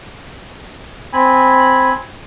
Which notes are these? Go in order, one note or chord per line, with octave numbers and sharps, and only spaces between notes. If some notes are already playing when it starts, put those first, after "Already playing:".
C4 G#5 B5